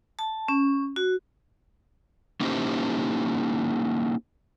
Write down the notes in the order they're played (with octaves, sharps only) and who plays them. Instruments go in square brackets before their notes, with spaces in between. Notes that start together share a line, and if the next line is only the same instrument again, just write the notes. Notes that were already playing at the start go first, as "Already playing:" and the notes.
[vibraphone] A5
C#4
F#4
[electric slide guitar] A#3 C#4 D#4 E4 G4 C5